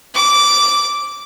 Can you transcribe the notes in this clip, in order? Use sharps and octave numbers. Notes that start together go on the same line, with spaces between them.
D6